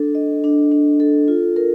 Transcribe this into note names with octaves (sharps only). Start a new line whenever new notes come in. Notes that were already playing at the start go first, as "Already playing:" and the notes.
Already playing: D4 A4
D#5
D4
D4
A4
F4
A#4